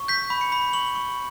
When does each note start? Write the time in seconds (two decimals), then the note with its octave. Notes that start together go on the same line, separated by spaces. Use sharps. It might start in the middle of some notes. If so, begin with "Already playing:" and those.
Already playing: C#6
0.08 G6 B6
0.30 B5
0.41 C#7
0.52 B5
0.73 C#6 F#7
0.96 C#6